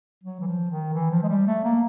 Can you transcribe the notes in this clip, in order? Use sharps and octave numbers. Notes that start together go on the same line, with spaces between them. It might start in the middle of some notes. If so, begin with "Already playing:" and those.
F#3
E3
F3
D#3
E3
F3
G#3
G3
A3
A#3